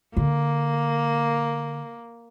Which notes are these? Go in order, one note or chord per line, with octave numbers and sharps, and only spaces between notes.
D3 A#3